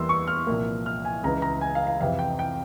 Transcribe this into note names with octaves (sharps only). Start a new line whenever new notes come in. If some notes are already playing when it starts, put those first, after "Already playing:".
Already playing: E2 E3 G3 A#3 C6 E6
C#6
F6
C2 A#2 F3 A#3
F6
G#5
C#2 C#3 E3 A#5
A#5
G#5
F5
F5
F2 C3 E3 F5
G5
G5